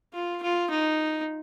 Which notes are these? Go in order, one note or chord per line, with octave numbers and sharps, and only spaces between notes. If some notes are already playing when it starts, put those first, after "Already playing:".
F4
F4
D#4